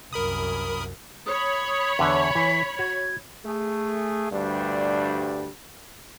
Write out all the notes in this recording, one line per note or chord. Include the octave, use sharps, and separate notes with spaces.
C2 F#2 A#4 B5 D#6
C#5 B5 D#6
D#6
E2 D3 F#5 C#6
E3 B6
F#4 G#6
A3 G#4
D2 G2 G3 D4